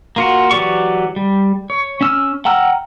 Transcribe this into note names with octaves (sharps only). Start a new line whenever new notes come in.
A#3 F4 F#4
E3 F#3 G4 D5 C#6
G3
C#5
C#4 E6 F6
F#5 G5 A#5 E6 F6